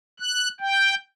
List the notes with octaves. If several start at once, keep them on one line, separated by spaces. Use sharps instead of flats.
F#6
G5